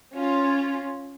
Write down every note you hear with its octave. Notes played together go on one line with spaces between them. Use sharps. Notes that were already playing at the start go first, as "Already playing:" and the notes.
C#4 F4